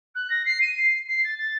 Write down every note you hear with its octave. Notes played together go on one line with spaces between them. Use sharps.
F#6
A#6
C7
D#7
C7
C7
A6
A6